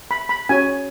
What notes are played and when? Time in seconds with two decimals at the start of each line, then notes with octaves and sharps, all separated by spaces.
0.11 B5
0.29 B5
0.49 C#4 F#4 C#5 G#5